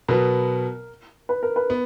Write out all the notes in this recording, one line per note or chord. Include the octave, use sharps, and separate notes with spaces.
B2 F#3 B3 A#4
B4
A#4
B4
B3